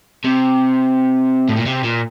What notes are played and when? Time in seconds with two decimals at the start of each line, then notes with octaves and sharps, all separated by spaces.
0.25 C3
1.49 A2
1.57 A#2
1.66 C3
1.84 A#2